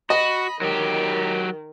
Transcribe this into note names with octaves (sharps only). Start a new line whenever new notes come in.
F#4 D#5 B5
D#3 F#3 G4